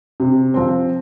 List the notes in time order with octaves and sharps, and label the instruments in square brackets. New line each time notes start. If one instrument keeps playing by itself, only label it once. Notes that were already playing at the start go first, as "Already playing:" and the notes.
[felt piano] C3
F3 C4